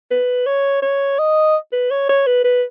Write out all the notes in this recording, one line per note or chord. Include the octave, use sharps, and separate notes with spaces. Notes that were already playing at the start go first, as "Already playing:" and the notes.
B4
C#5
C#5
D#5
B4
C#5
C#5
B4
B4